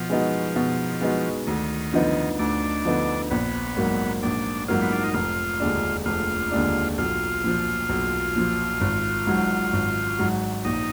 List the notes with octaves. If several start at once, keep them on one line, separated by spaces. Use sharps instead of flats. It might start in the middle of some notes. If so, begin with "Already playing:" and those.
Already playing: B2 F3
G#3 B3 D#4 F#4
B2
G#3 B3 D#4 F#4
D2 D#3
D3 F3 B3 D#4
D2 D4
D3 F3 B3 D#4
A#1 B3
G#2 F#3 A#3
A#1 D4
G#2 F#3 A#3 F4
B3
D4
D#4
F1 F4
D#2 D3 G#3 D4
F1 F4
D#2 D3 G#3 D4
B1 F4
A#2 F3
B1
A#2 F3
G#1
G#2 F#3
G#1
G#2 F#3
A#1 D#4